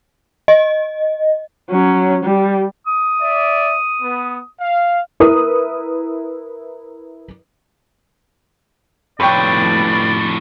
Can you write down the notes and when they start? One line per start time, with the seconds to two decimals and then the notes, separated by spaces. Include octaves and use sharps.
0.48 D#5
1.70 F#3 C#4
2.24 G3
2.87 D#6
3.22 D5 E5
4.02 B3
4.60 F5
5.20 E4 A#4 B4 D#6
9.20 F2 A2 B4 C#5 D5 G5